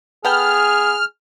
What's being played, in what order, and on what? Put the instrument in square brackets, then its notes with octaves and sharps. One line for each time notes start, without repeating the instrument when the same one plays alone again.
[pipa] B3 A4 G5 [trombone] G#4 [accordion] F6